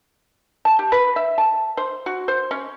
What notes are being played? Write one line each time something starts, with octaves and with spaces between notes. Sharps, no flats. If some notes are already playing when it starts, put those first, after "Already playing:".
A5
G4
B4
E5
A5
C5
F#4
C5
C#4